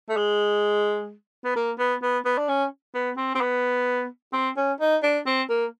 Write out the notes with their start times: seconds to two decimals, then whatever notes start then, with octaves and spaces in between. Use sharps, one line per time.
0.09 A3
0.17 G#3
1.44 B3
1.56 A#3
1.79 B3
2.02 B3
2.25 B3
2.38 D4
2.49 C#4
2.94 B3
3.17 C4
3.35 C4
3.41 B3
4.33 C4
4.57 C#4
4.80 D#4
5.03 D4
5.26 C4
5.50 A#3